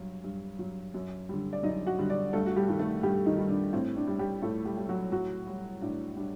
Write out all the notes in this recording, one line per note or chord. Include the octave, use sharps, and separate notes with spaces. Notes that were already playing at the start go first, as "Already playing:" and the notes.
Already playing: G2 F#3
G2
F#3
F#2
D3 G3
D5
F#2 D#4 D#5
F#4 F#5
D3 G3
D4 D5
G2 A3 A4
F#4
G3 G4
D#3 G3
A3 A4
G2 G3 G4
D#3 D#4
D#3 G3
D4
A2 C4
D4
G3
G3 G4
A2 A3 A4
G3 G4
G3
F#3 F#4
A2 F#3 F#4
G3
A2 D4
G3 D4